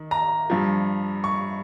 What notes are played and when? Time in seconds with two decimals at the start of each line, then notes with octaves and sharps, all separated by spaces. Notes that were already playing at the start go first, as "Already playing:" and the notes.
Already playing: D#3
0.11 A#5
0.50 G2 F3
1.24 C#6